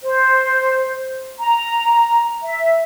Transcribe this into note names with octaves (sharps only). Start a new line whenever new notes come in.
C5
A#5
E5